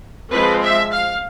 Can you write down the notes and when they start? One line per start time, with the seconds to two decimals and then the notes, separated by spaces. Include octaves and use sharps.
0.32 F3 G#3 C4 B4
0.62 E5
0.92 F5